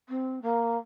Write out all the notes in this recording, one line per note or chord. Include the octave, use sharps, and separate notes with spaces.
C4
A#3